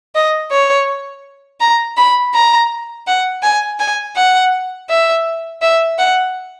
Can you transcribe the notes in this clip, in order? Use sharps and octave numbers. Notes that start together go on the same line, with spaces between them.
D#5
C#5
A#5
B5
A#5
F#5
G#5
G#5
F#5
E5
E5
F#5